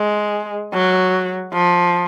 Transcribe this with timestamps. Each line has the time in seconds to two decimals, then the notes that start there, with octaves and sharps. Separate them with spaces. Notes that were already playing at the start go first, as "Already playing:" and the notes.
Already playing: G#3
0.73 F#3
1.53 F3